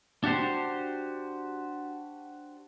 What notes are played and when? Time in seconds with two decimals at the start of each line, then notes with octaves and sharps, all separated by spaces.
0.24 D4 F#4 G4 C5